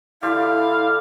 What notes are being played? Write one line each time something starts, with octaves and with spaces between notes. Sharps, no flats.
D3 E4 F4 G4 F5